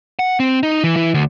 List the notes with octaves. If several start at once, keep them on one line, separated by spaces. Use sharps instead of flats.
F#5
C4
D#4
E3
E3
D2